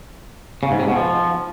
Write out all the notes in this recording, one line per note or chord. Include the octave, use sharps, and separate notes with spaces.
C#3
G#2
C3
B2
F3